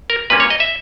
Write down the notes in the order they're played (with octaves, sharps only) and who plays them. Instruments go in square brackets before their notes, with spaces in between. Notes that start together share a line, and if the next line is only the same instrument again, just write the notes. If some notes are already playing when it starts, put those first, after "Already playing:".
[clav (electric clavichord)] A#4
A#2 G3 A#3 C#4 B4
C#5
D#5
E5